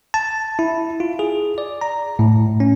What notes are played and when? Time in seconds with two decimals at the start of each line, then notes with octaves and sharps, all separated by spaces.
0.14 A5
0.59 E4
1.00 F4
1.19 G#4
1.58 D5
1.81 A#5
2.19 A2
2.60 C#4